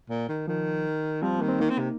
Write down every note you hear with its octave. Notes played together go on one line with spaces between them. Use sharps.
A#2
D#3
D#3 F3
F3 G3 C4
D#3 A#3
C4
D#3 A#3 D#4
C4
C3